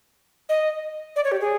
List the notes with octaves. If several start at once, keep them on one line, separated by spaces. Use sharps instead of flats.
D#5
D5
C#5
G4
G#4